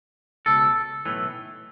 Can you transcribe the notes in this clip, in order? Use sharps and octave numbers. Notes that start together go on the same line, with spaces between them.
C#2 B2 A4
B1 A2 E3